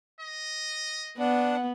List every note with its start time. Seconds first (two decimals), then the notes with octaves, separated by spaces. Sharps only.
0.21 D#5
1.18 B3 D4 F#5